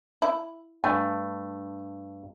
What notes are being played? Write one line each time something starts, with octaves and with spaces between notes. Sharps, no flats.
E4
G2 A3 G#5